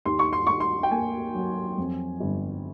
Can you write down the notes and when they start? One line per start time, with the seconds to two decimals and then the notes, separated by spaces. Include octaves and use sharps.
0.06 D#2 C6
0.19 C#6
0.33 C6
0.47 D#2 C#6
0.60 C6
0.83 G5
0.91 A#3 G#5
1.34 F#3
1.78 F2
2.20 G1